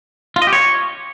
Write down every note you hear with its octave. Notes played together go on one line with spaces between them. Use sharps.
F4
D#5
G4
C#5